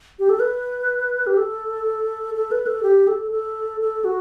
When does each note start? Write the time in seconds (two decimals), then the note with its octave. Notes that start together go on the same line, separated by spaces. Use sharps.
0.19 G4
0.29 A4
0.40 B4
1.27 G4
1.37 A4
2.34 A4
2.51 B4
2.67 A4
2.83 G4
3.08 A4
3.32 A4
3.81 A4
4.04 F#4